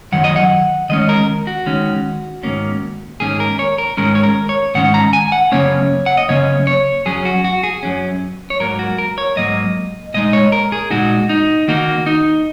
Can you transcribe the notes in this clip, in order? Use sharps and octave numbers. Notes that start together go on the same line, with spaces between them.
F#2 D#3 F#3 F#5
D#5
F#5
D#3 G#3 C#4 D#5
A#4
F#4
D#3 G#3 C#4
G#2 D#3 A#3 C#4
G#2 D#3 A#3 C#4 G#4
A#4
C#5
A#4
G#2 D#3 G#3 C#4 A#4
C#5
A#4
C#5
G#2 D#3 G#3 C#4 F#5
A#5
G#5
F#5
F#2 C#3 A#3 C#4 C#5
F#5
D#5
F#2 C#3 A#3 C#4 C#5
C#5
F#2 F#3 C#4 G#4
F#4
F#4
G#4
F#2 F#3 C#4
C#5
G#2 F#3 A#3 A#4
F#4
A#4
C#5
G#2 F#3 A#3 D#5
A#2 G#3 D#4 D#5
C#5
A#4
G#4
A#2 G#3 D#4 F#4
D#4
D#3 A#3 D#4 F#4
D#4